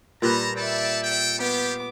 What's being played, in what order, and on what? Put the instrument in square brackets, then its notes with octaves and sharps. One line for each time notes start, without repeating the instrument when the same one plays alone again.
[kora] A#2 G3 B4 [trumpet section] A5 A#5
[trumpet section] A4 G5 A5 [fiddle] D5 E5
[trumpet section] A4 G5
[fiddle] B3 D6 [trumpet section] F4 G4